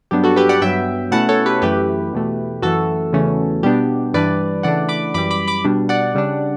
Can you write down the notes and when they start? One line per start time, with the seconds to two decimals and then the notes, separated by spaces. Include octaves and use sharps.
0.11 G2 F#3 B3 D4 G4
0.24 F#4 A4
0.36 G4 B4
0.49 D5 F#5
0.62 G2 F#3 B3 E5 G5
1.12 B2 A3 C#4 E4 F#5 A5
1.29 A4 C#5
1.46 G4 B4
1.62 F#2 E3 A3 E4 G4 B4
2.13 E2 B2 A3
2.62 F#2 E3 A3 F#4 A4
3.13 E2 C#3 E3 A3 C#4
3.63 B2 G3 B3 D4 G4
4.14 G2 E3 G3 D4 B4 D5
4.63 C#3 E3 A3 D4 D5 F#5
4.89 B5 D6
5.14 F#2 E3 G3 B5 D6
5.31 B5 D6
5.48 B5 D6
5.64 B2 G3 D4
5.89 D5 F#5
6.15 C#3 G3 D4